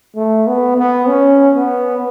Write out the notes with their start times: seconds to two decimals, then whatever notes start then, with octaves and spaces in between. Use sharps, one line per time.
0.15 A3
0.47 B3
0.78 B3
1.08 C#4
1.55 B3